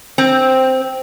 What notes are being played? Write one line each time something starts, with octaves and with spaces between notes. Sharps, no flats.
C4